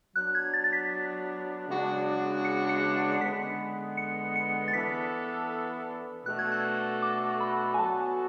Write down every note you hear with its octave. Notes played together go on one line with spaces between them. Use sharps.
F#3 B3 D4 F#6
G#6
A6
A6
B6
C#3 G#3 B3 D4 F#4
C#7
C#7
C#7
D3 G#3 B3 B6
C#7
C#7
A6
E3 B3 D4 A4 B6
B2 A3 D4 F#4 A4 F#6
G#6
F#6
D6
B5
G#5
F#3 B3 F#4 A4 A5